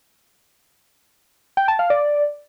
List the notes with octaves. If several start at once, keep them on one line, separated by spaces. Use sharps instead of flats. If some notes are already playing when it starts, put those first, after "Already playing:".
G5
A5
F5
D5